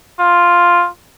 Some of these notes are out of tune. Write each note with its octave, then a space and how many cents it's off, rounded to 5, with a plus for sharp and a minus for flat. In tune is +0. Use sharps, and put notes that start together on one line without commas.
F4 +0